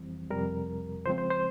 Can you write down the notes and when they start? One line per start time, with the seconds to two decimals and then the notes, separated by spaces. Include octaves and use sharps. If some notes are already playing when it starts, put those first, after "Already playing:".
Already playing: F2 E3 G3 C4
0.30 F2 C3 G3 A#4
1.05 C#3 F3 G#3 C4 C5
1.18 C5
1.30 C5